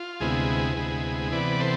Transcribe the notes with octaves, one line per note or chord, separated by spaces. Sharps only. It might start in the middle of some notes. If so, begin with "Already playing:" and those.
Already playing: F4
D2 C3 G#3 B3 E4 G#4
D2 C3 G#3 B3
C3 E3 B3 B4 D5
A4 C5